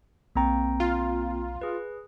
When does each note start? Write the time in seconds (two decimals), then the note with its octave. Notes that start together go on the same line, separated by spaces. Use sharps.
0.36 B1 A#3 C4 G5 A#5
0.80 F4
1.61 G#4 B4